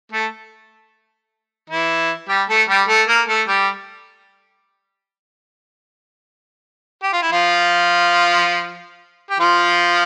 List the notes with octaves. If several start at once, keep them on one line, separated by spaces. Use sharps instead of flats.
A3 A4
E3 E4
G3 G4
A3 A4
G3 G4
A3 A4
A#3 A#4
A3 A4
G3 G4
G4
F4
E4
F3 F4
G4
F3 F4